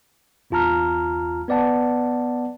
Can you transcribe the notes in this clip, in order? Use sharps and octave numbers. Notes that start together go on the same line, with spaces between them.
G1 E2 F4 A5 A#5 F6
B3 B4 D5 F#5 A5